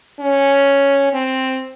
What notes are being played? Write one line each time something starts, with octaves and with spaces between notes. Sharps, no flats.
C#4
C4